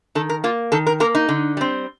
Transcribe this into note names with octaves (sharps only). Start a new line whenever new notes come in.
D#3 A4
A#4
A#3 F4
D#3 A4
A#4
A#3 A#4
D#4
D3
G3 C4